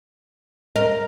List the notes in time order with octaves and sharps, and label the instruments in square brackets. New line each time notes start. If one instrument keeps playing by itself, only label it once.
[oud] A#4 [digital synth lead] D#5